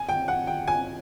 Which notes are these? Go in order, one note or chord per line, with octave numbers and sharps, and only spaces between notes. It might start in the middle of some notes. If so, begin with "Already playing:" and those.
Already playing: G#5
G5
F#5
G5
G#5